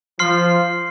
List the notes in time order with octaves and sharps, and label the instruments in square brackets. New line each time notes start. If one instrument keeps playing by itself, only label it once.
[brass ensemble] F3 [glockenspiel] C6 F6 C7